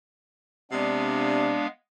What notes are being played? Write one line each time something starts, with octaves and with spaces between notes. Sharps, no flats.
C3 G#3 B3 D4 F5